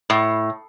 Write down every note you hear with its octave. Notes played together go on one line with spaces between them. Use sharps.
A2